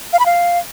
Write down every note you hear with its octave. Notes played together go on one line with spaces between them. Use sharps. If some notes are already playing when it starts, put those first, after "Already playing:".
F5
B5
F5